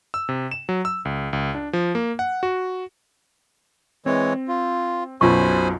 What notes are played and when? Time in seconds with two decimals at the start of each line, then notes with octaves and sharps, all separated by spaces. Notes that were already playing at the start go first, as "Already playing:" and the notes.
0.14 E6
0.29 C3
0.51 E7
0.69 F#3
0.85 E6
1.05 C#2
1.33 C#2
1.55 D4
1.73 F3
1.95 A#3
2.19 F#5
2.43 F#4
4.06 E3 G#3 C4 C#5
4.48 F4
5.21 B1 F#2 B2 F4 C5 G#5 B5 C#6